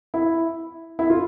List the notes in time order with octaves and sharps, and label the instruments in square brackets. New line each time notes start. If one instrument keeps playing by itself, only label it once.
[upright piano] E4
E4
F4